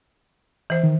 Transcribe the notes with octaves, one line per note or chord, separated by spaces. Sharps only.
E3 C5
D#3